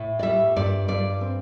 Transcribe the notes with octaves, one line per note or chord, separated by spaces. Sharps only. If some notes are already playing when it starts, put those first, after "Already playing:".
Already playing: A2
D5
G3 E5
G2 D5
G2 D5
C4